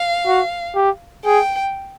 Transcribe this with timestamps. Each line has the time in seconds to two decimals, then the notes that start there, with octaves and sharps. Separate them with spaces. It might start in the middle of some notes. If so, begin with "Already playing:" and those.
Already playing: F5
0.26 F#4
0.75 G4
1.25 G#4 G5